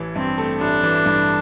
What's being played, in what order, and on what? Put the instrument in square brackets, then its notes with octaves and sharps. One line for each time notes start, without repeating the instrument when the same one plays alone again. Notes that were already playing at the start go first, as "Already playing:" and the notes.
Already playing: [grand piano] A1 E3
[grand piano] G2 [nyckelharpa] C4
[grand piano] A3
[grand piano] A1 [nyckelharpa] D4
[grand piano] E3
G2